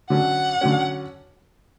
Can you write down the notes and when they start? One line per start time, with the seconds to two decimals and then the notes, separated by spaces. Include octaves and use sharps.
0.10 D3 F#3 C#4 F#5
0.61 D3 F#3 C#4